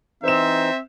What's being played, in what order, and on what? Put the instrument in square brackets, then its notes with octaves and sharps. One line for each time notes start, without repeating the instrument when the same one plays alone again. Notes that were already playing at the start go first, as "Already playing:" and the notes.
[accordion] E3 D#4 [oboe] C4 [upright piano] C5 E7 [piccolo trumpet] E5